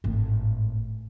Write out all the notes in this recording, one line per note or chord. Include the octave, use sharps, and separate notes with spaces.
G#1 A2